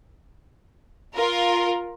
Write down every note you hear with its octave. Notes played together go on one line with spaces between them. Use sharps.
F4 A#4